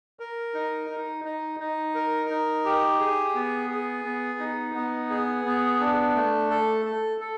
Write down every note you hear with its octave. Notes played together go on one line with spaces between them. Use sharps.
A#4
D#4
D#4
D#4
D#4
A#4
D#4
G4
G#4
B3
G#4
B3
D#4
B3
G#4
B3
D4
A3
A4
A4
A4